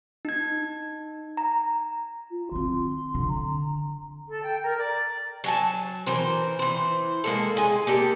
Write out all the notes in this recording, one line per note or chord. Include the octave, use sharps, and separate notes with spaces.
D#4 G#6
A#5
F4
D#3 C4 C6
D3
A#5
A4
G5
A#4
D5
F#3 G#5 A5
E3 A#4 C5
E3 C5
G#3 A#3 A4
G#3 G#5
A#3 G4 A4